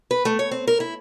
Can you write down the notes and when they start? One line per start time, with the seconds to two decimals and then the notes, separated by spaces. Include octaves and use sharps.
0.11 B4
0.25 A3
0.39 C#5
0.51 C4
0.67 A#4
0.80 E4